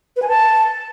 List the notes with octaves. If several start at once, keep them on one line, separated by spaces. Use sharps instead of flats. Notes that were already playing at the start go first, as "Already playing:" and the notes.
B4
G#5
A5